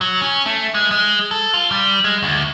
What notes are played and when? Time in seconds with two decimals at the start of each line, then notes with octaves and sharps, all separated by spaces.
0.01 F#3
0.22 C#4
0.46 A3
0.74 G#3
0.91 G#3
1.31 A4
1.54 F4
1.71 G3
2.04 G#3
2.23 D2